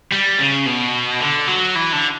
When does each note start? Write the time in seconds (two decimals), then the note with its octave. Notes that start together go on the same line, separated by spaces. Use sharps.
0.13 G3
0.39 C#3
0.67 B2
1.21 D3
1.48 F#3
1.76 E3
1.93 D3